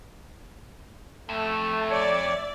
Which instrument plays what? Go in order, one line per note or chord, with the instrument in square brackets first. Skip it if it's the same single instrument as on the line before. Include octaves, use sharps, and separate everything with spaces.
[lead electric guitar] F2 [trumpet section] A3
[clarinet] C#5 [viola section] D5 E5